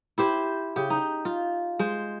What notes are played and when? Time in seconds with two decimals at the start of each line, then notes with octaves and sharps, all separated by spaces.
0.18 E4 G4 C5
0.76 C#3 G4
0.90 D#4
1.25 F4
1.79 G#3 C5